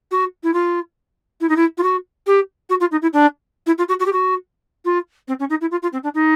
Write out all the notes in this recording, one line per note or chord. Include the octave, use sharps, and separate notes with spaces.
F#4
E4
F4
E4
D#4
E4
F4
F#4
G4
F#4
F4
D#4
E4
D4
E4
F4
F#4
F#4
G4
F#4
F4
C4
C#4
D#4
E4
F4
F4
C4
D4
D#4